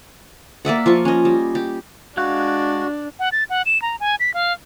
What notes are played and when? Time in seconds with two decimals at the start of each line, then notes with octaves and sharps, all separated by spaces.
0.65 A#3 D5 E5 F#5
0.86 F3 F4 C#6
1.05 C#4 D#5
1.25 G3
1.55 G4
2.17 G#3 D4 F#4 F5 F#6
3.19 F#5
3.32 A6
3.50 F#5
3.66 E7
3.82 A#5
4.00 G#5
4.20 B6
4.34 F5